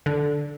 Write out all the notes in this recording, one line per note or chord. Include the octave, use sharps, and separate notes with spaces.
D3